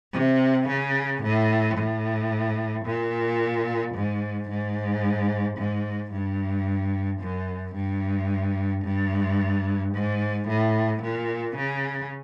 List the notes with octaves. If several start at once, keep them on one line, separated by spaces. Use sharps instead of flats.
C3
C#3
A2
A2
A#2
G#2
G#2
G#2
G2
F#2
G2
G2
G#2
A2
A#2
C#3